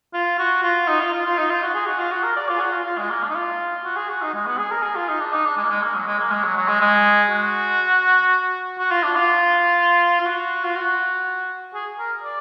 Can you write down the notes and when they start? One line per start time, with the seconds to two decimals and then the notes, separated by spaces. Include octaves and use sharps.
0.14 F4
0.39 F#4
0.63 F4
0.88 D#4
1.00 F4
1.13 F4
1.26 F4
1.38 D#4
1.50 F4
1.63 F#4
1.75 G#4
1.86 F#4
1.99 F4
2.12 F#4
2.23 A#4
2.36 D5
2.49 F4
2.57 G#4
2.60 F#4
2.73 F4
2.86 F4
2.98 G#3
3.10 A#3
3.23 D4
3.30 D#4
3.35 F4
3.84 F#4
3.97 G#4
4.09 F#4
4.22 D#4
4.34 G#3
4.46 B3
4.58 G#4
4.71 A#4
4.83 G#4
4.95 F4
5.08 D#4
5.20 D4
5.33 D#4
5.45 D4
5.57 G#3
5.65 A#3
5.70 G#3
5.82 A#3
5.94 F#3
6.06 G#3
6.20 A#3
6.31 G#3
6.44 F#3
6.56 F#3
6.68 G#3
6.81 G#3
7.31 F#4
8.79 F#4
8.91 F4
9.03 D4
9.16 F4
10.20 F4
10.26 F#4
10.64 F4
10.76 F#4
11.74 G#4
11.99 A#4
12.24 D5